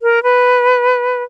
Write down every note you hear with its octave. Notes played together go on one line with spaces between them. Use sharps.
A#4
B4